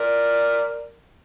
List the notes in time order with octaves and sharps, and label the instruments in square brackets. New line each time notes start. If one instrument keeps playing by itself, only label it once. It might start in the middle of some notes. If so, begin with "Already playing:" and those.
Already playing: [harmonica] A#4 D5